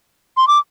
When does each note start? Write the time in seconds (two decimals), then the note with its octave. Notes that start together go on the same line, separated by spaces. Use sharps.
0.37 C6
0.48 D6